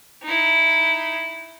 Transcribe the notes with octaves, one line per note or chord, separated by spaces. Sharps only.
D#4 E4